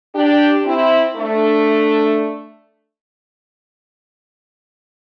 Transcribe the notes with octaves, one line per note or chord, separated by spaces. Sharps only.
D4 G4
C4 E4
A3 D4